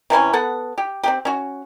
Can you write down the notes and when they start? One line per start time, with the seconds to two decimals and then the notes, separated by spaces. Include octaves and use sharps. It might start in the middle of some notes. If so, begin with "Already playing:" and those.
0.10 C3 E3 C#4 B4
0.33 B3 A4 F#5
0.78 G4
1.03 C4 D#4 G4
1.25 C#4 F#4